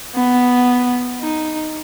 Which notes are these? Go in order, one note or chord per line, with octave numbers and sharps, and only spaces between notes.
B3
D#4